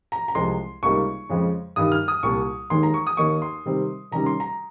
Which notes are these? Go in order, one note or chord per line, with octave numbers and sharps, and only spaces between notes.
A#5
A#5
C2 C3 F3 G#3 C6
C#2 C3 G3 A#3 D#4 C#6
F2 C#3 F3 G#3
G2 D#3 G3 D#6
F6
D#6
C2 A#2 G3 C#6
D#2 D#3 G#3 D#4 C6
A#5
C#6
D#6
D#2 D#3 A#3 D#4 C#6
C6
C3 D#3 G3 C4
C3 D#3 G3 C#4 A#5
C6
A#5